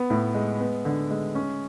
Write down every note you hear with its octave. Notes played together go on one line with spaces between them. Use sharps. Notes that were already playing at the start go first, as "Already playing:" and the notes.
Already playing: B3
A2
G#3
B3
D3
G#3
C#4